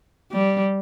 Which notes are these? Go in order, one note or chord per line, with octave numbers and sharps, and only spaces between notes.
G3